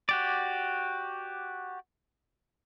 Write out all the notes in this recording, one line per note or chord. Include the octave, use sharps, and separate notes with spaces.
F#4 G4 D5